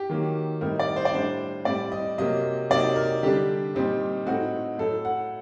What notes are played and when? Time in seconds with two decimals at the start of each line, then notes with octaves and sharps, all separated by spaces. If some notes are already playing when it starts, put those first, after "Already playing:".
Already playing: G4
0.09 D#3 F#3 A#3
0.61 A2 G3 C4 D#4 A#4
0.79 D5
0.96 C5
1.05 D5
1.14 A2 G3 D4 C5
1.65 A2 G3 C4 D5
1.92 D#5
2.18 C3 F#3 A#3 D#5
2.70 C3 F#3 A#3 D#4 D5
2.96 A#4
3.23 D3 G3 D4 G4
3.75 A#2 G3 C4 D#4
4.26 A2 A3 C4 D#4 F#4
4.78 A2 F#3 A3 A4
5.05 F#5